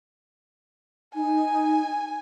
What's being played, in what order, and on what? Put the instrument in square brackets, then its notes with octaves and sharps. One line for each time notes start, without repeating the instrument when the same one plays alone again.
[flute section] D#4 [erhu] G#5